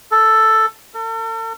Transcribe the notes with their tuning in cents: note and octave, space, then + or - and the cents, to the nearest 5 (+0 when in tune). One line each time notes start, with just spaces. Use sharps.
A4 +5
A4 +45